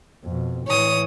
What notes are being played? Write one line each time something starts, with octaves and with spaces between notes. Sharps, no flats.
F2 B2
A2 E3 C#5 D#6